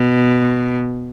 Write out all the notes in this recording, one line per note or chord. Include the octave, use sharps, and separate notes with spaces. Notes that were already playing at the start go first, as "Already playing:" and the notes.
Already playing: B2